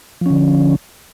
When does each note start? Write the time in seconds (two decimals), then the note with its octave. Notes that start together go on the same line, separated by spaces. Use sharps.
0.21 F3
0.26 C#4
0.30 D3